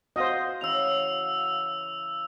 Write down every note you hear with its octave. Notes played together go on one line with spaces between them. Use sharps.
F#4 C5 D#5 F5 D#6
C#3 E3 E6 F7